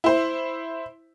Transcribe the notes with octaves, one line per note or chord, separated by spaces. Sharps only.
E4 C5